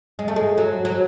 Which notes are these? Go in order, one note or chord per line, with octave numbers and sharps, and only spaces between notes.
G#3
A3
G#3
F#3
F#3